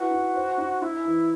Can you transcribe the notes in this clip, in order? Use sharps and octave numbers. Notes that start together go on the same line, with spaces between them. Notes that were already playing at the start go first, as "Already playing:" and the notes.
Already playing: E4 F#4 B4
D#4
C5
D#4
D#4 E4
E3